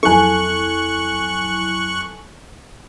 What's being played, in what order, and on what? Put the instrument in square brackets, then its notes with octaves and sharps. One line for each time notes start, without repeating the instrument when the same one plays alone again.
[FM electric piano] F2 F#3 E4 [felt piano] A4 G#5 [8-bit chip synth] C#6 F#6